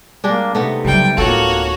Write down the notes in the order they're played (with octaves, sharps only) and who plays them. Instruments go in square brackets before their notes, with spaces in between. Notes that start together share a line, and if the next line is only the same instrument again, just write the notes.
[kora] G3 G#3 D4 [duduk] A#3
[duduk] C3 [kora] A3 B3 D#4
[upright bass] C#3 F#3 [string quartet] G3 G5
[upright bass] D1 F4 [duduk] A#3 [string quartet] F#4 C#5 [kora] A4